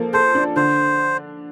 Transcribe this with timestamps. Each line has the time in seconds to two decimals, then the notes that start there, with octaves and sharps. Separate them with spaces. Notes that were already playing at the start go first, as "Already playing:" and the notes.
Already playing: F3 A#3 A4
0.13 A4 C5
0.35 D4
0.56 D3 C5